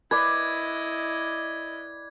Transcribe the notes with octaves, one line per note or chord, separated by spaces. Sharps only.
E4 B4 D5 D#5 G#6